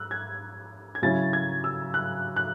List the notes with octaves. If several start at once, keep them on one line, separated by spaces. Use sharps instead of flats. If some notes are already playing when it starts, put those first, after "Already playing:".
Already playing: E6 F#6
G#6
G#6
C#3 F#3 C#4 E4 A6
G#6
E6
F#6
F#6